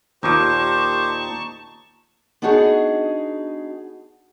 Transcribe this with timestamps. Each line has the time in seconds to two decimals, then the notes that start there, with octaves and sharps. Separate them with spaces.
0.23 D#2 A#2 D#4 G4 C5 A5 C#6 D6
2.42 B3 D4 D#4 F#4 G#4